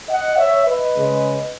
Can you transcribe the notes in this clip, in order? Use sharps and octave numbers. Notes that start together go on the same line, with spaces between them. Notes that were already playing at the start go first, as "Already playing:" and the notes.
D#5 F#5
C#5 E5
B4 D#5
C#3 G#3